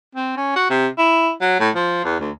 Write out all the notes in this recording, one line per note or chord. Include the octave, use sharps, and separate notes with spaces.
C4
C#4
F#4
C3
E4
F#3
A2
F3
E2
D2